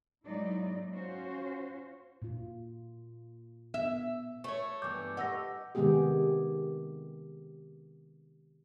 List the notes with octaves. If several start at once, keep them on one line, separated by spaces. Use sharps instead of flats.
F#3 G#3 A#3 D#4 E4 D5
C#4 F4 F#4 C5
A#2 F4
B3 E5
A3 C5 C#5
G2 E3 B3 D6 G6
G4 B4 D#5 F#5 E6 A#6
C3 D#3 G#3 B3 G4 G#4